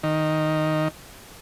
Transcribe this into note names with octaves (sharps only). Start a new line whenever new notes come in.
D#3